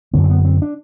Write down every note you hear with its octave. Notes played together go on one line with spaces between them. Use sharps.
F#2 D3 B3
C4
B3
C4
D4